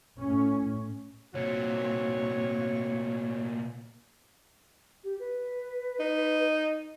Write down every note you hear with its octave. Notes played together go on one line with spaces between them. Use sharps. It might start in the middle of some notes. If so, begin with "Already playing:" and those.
A2 C#4
C2 A#2 C4 F#4 C#5
G4
B4
D#4